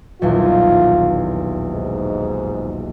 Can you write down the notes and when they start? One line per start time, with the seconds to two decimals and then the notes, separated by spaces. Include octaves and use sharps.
0.22 D#1 B1 E2 F4
1.72 G#2